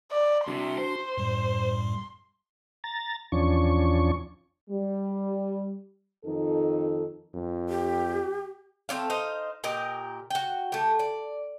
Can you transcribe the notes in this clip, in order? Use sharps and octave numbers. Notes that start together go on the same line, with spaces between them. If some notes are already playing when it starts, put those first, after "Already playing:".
D5
C2 C3 D4 F#4 C6
C5
F#2 A2 G3
A#5 A6
E2 F3 C#4 D4 C#6
G3
F2 D#3 D#4 A4
F2
G4
A3 C4 D5 F5
D#4 C5 F5
A#2 G4 A#4 D#5
F#4 G5
A3 G4
D5